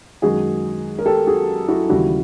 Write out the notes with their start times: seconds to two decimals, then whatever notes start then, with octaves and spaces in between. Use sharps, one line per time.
0.22 F#2 D#3 G#3 F#4 G#4
0.98 A#4
1.06 G4 A4
1.27 F#4 G#4
1.68 E4 F#4
1.89 D#2 C#3 E3 G3 E4 F#4